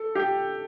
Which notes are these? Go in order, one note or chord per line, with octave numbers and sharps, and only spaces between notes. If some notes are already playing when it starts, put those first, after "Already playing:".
Already playing: A4
G4